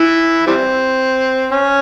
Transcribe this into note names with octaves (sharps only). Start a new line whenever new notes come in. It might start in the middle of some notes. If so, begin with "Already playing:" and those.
Already playing: E3 E4
E3 G3 C4
C#4